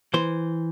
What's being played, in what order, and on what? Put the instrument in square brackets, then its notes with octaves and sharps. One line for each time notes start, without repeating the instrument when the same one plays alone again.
[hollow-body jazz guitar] E3 C5